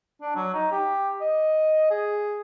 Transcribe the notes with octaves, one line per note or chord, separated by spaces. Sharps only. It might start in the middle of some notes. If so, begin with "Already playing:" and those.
D4
F#3
D#4
G4
D#5
G#4